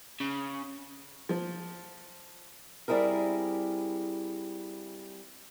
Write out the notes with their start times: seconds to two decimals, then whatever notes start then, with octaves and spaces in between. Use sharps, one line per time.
0.20 C#3
1.29 F3
2.88 G3 C4 E4 G#4 A#4